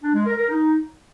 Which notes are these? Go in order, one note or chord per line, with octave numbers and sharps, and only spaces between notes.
D4
G#3
A#4
A#4
D#4